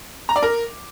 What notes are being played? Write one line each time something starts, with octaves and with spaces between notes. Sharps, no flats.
A#5
D5
A#4